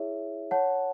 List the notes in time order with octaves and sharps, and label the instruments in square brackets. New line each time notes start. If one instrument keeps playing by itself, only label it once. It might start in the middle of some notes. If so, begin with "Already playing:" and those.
Already playing: [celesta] E4 G#4 C#5 E5
C#5 F#5 A5